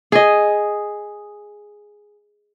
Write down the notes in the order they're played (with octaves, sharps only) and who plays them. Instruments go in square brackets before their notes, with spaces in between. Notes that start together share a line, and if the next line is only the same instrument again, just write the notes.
[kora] G#4 D#5